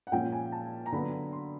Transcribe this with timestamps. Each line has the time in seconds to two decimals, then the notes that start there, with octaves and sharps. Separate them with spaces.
0.07 F#5
0.12 A#2 F3 G#3 C#4 G5
0.32 G#5
0.52 A5
0.86 A#5
0.92 D3 F#3 B3 B5
1.33 C6